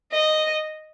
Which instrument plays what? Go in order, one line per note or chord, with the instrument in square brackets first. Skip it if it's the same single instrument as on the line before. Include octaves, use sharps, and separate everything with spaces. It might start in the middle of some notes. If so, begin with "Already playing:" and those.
[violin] D#5